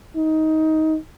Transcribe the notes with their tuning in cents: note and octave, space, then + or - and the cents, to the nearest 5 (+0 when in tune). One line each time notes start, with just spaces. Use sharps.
D#4 +15